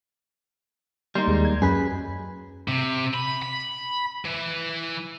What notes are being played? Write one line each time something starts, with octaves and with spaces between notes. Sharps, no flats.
G3 A#3 D#4 C6
D#2 G#3
G#6
F#2 G#4 B4
C3
B5
B5
E3